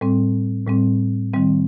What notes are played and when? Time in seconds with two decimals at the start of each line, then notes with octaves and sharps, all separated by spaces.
0.01 A2 G3 C4
0.67 A2 G3 C4
1.34 D#3 G3 C4